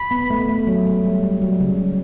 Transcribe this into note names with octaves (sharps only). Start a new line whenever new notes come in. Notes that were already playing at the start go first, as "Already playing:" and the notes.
Already playing: B5
B3
A3
A3
F#3
A3
G3
G3
F#3
C#3